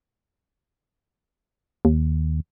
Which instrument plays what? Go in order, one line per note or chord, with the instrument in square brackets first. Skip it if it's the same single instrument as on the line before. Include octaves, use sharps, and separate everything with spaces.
[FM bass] D#2